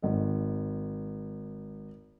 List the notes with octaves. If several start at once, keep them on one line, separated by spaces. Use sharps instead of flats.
G#1 D#5